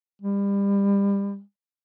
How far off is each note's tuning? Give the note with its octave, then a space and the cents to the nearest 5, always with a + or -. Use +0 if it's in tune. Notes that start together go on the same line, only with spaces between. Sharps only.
G3 +30